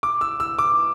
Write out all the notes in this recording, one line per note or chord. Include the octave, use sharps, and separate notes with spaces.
D6
E6
E6
D6